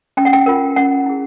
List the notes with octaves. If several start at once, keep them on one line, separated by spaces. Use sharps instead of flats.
C#4 G5
F#5
G5
F4 A#4
C#4 F#5
E4 G#4